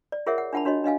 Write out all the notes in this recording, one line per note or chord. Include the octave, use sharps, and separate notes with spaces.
D5
F4 G#4 A#4 C#5 E5 F#5
F#5
D4 F4 F#5 A5 B5
D4 F#4 C#5 D#5
D4 D#5 F5 G#5